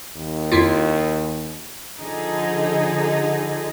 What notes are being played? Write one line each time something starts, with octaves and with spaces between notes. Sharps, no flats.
D#2
F2 E4 F4
D3 F3 D#4 G#4 A4